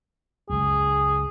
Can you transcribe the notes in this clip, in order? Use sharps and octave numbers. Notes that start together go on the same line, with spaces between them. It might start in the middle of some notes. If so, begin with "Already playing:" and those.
C#2 F#2 G#4